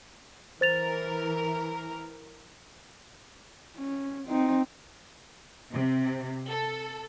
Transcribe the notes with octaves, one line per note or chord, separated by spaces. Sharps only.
E3 A#4 C5 A6 F7
C#4
C4 D#4
C3
A4